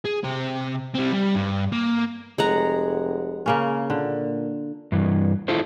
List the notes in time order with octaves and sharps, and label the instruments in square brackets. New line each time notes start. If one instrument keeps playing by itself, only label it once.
[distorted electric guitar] G#4
C3 C5
G3 C4
G3
G2
A#3
[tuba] F1 [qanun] G#3 F#5 A#5
[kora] C#3 A#3 C#4
[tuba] A#2 [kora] D3
[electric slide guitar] G2 E3
E4 F4 A4 C5